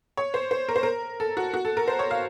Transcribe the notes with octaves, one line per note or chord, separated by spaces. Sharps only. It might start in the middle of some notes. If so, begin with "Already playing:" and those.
C#5
C5
C5
A#4
C5
A#4
A4
F#4
F#4
A4
A#4
C5
C#5
F5